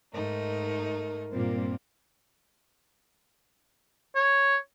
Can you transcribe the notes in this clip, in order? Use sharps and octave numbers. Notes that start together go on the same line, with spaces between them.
G#2 A3 D#4 A#4
G2 A#2 G3 A#3 C4
C#5